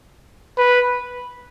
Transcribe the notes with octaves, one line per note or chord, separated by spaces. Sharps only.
B4